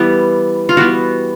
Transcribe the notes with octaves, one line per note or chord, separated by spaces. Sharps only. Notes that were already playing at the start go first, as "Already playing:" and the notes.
Already playing: E3 G3 B3
F4
E3 G3 B3 F#4